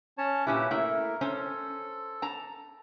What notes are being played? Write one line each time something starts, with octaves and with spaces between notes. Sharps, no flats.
C#4 C#5 A5
A#2 C#4 E4 G4 B4
A3 A#3 E4 A#4
C#4 A4 C5
A5 A#5